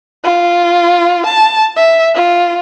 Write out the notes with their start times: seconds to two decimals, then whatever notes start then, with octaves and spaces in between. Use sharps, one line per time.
0.24 F4
1.26 A5
1.76 E5
2.15 F4